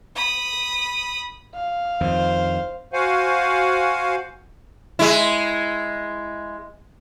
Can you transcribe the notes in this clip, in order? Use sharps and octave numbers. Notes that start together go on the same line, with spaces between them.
B5 D#6
F5
F2 D#3 C5
F#4 C5 F5 F#5 G#5
G#3 E4